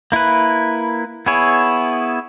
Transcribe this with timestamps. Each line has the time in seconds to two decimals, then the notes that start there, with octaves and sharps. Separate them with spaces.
0.12 A#3 E4 B4
1.26 B3 E4 G#4 C#5